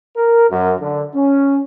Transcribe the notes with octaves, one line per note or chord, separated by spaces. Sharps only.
A#4
F#2
D3
C#4